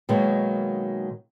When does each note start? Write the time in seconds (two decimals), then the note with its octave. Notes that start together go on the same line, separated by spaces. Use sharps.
0.09 B2 D#3 F#3 G#3 A#3